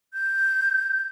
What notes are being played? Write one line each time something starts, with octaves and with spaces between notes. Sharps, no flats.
G6